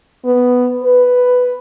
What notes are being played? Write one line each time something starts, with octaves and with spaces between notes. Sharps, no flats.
B3
B4